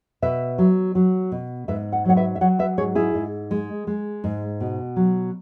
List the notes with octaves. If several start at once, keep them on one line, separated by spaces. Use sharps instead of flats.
B2 B4 E5
F#3
F#3
B2
G#2 B4 E5
F#5
F#3 C#5 F#5
B4 E5
E5
F#3 C#5 F#5
B4 E5
G#2 G#4 C#5
E4 G#4
G#2
G#3
G#3
G#2
B2
F#3